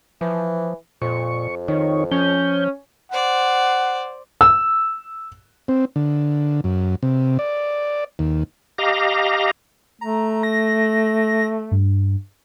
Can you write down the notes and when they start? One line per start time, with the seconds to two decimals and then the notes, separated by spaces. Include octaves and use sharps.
0.21 E3 F3
1.02 F2 A#2 C#6
1.68 D#3 D#4 C#5
2.11 F3 C#4 G6
3.12 C5 D5 F#5
4.41 E6
5.68 C4
5.96 D3
6.64 F#2
7.03 C3
7.39 D5
8.19 D#2
8.78 G4 D#5 F5 A#5
10.01 A3 A#5
10.43 A#6
11.71 G2